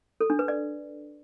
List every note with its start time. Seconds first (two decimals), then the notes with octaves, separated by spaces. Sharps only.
0.21 A4
0.30 D4
0.39 B4
0.48 D5